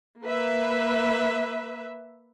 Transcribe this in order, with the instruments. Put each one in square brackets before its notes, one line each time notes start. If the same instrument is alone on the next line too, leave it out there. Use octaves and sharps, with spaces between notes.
[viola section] A#3 B4 E5